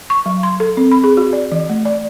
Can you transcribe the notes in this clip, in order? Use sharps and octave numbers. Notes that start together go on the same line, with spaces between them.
C#6
F#3
C6
A4
C4
B5
G#4
F#4
D5
E3
A3
D5